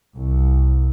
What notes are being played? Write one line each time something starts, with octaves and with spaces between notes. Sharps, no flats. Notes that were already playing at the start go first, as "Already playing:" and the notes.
C2